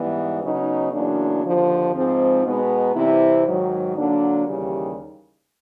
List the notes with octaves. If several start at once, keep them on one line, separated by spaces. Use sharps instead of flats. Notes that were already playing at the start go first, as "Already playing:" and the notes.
Already playing: G#2 E3 G3 B3
C#3 F#3 B3 D#4
E2 C#3 F#3 A#3 D4
D#2 D3 F3
G#2 F3 G#3 C4
B2 G#3 B3 D#4
C3 E3 G3 C4 E4
G#2 D#3 F#3
D3 F#3 A#3 D4
D#2 C#3 E3 G3